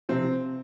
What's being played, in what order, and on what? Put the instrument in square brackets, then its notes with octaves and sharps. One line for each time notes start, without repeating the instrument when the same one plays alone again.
[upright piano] C3 F3 C4